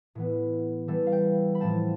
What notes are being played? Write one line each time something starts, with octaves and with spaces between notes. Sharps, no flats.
A2 E3 B3
E3 G3 B3 A4
F5
G5
B5
A2 F3 C4 A5